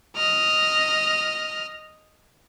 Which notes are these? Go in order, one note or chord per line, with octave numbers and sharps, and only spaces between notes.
D#5 F6